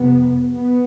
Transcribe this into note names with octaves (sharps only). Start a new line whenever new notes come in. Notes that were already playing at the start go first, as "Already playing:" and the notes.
Already playing: F2 C3 B3
B3